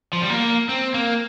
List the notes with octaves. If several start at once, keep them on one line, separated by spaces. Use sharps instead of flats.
F3
G3
A#3
C4
A#3